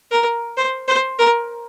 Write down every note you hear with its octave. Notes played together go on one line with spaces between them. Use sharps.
A#4
C5
C5
A#4